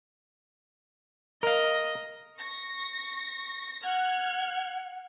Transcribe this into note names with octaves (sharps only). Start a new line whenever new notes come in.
A#4 D#5 F5
C#6 A#6
F#5 F6 F#6 G#6